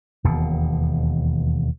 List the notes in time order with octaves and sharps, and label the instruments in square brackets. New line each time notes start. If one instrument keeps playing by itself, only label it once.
[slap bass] E1 D#2 B2